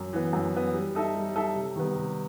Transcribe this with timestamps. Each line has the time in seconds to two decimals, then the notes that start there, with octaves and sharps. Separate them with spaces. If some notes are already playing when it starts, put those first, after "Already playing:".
Already playing: F#2
0.13 E3 B3
0.33 F#2
0.54 E3 B3
0.74 G3
0.95 D#4 A4 E5
1.15 G3
1.35 D#4 A4 E5
1.56 C3
1.76 D#3 G3 B3
1.96 C3